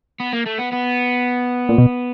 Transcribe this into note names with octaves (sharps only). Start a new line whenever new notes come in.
B3
A#3
A3
B3
B3
A#2
B2